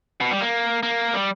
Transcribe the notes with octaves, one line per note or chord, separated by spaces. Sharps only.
B2
G3
A#3
A#3
G3